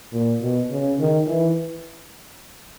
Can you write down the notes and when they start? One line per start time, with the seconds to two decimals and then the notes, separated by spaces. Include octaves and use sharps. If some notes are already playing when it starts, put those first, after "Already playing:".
0.12 A#2
0.41 B2
0.70 C#3
0.99 D#3
1.27 E3